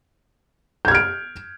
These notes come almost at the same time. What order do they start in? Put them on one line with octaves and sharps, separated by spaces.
G6 G#6 F6 D7